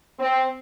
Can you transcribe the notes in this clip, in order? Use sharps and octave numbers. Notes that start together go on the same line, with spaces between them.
C4